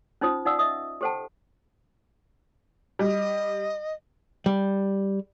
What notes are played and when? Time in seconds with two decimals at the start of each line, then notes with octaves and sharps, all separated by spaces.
0.21 C#4 D#4 F4 C5 D#6
0.46 D#4 D5 F5 F#5 D#6 E6
0.59 D#5 E5 D#6
1.01 G4 A4 C5 F#5 G5 A5
2.99 G3 D#5
4.46 G3